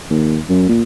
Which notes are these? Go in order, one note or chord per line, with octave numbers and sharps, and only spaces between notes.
D#2
F#2
A#2